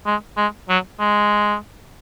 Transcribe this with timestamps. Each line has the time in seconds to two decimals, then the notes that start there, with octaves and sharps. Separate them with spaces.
0.06 G#3
0.37 G#3
0.69 F#3
0.99 G#3